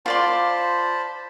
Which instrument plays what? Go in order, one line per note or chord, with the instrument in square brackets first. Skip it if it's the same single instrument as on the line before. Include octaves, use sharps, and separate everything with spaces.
[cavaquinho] F4 D5 C6 [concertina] C5 A5 B5